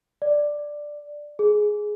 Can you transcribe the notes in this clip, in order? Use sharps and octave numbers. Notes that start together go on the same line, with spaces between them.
D5
G#4